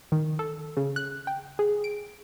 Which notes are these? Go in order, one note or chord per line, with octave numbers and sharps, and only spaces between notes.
D#3
A4
C#3
F#6
G5
G#4
D7